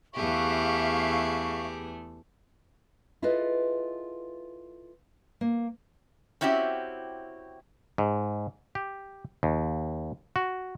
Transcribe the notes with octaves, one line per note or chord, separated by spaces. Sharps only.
E2 A3 G4 G#4 E5 F5 C#6
E4 F4 G#4 A4 B4 D#5
A#3
C4 C#4 E4 F#4 G4
G#2
G4
D#2
F#4